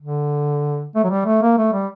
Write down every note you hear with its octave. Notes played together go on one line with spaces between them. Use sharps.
D3
A3
F#3
G3
A3
A#3
A3
G3